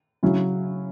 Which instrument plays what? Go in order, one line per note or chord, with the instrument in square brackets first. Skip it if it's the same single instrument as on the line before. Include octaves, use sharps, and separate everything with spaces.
[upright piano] C#3 F#3 C#4 E4